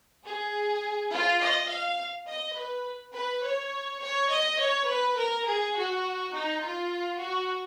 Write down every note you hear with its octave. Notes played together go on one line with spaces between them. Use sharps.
G#4
F4
D#5
F5
D#5
B4
B4
C#5
C#5
D#5
C#5
B4
A#4
G#4
F#4
D#4
F4
F#4